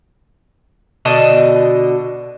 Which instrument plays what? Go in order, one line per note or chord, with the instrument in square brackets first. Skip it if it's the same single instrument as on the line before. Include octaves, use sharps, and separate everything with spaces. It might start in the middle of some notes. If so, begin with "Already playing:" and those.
[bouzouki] B2 D3 D#5 A5